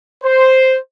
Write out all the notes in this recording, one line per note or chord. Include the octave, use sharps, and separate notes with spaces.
C5